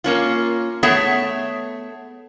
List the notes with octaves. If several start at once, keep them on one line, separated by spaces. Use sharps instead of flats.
A#3 C#4 F4
A3 B3 G#4 C#5